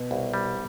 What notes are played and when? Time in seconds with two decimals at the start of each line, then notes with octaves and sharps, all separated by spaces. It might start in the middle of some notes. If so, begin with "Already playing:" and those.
Already playing: B2
0.11 C2
0.34 G3